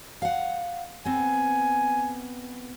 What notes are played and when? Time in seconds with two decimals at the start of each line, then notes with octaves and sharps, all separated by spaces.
0.22 F5 F#5
1.05 B3 C4 G#5